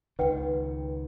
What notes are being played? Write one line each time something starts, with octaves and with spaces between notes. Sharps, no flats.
C#2 D#3 B4 F#5 G5